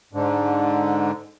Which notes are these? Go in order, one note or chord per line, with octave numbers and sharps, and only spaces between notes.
G#2 D3